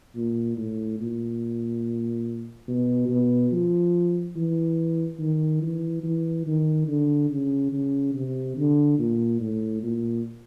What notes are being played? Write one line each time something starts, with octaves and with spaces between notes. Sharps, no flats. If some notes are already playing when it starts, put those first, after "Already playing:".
A#2
A2
A#2
B2
B2
F3
E3
D#3
E3
E3
D#3
D3
C#3
C#3
C3
D3
A#2
A2
A#2